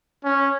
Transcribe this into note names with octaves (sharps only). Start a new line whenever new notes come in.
C#4